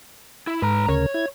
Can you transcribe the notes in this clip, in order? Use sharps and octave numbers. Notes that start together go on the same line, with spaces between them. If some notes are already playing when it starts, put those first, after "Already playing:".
E4
G#2 B4 A#5
D2 C#3 A#4 C#5
E4 G#6